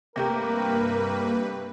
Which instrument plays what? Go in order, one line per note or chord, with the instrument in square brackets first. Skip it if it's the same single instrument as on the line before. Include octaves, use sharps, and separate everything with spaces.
[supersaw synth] G2 B4 [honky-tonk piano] C3 A3 G4 [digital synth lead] A#3 [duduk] A#4